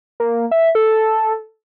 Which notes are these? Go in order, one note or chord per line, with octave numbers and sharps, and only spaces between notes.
A#3
E5
A4